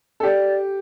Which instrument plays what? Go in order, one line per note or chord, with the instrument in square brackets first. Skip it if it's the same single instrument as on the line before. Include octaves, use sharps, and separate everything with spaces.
[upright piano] A4
[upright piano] G4 [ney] D5